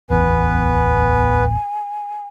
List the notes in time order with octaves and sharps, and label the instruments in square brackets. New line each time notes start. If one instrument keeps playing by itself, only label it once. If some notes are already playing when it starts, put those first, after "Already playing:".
[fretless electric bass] D1 A1 E2 [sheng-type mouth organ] B3 B4 [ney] G#5